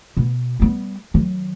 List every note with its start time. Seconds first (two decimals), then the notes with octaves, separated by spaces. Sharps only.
0.17 B2 B3
0.60 G3 B3
1.14 D#3 F#3